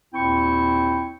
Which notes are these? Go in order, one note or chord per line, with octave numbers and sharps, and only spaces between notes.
D#2 A#2 C4 E4 G5 C#6